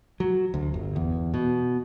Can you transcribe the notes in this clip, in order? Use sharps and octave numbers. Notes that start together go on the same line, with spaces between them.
F#3
D2
G1
E2
B2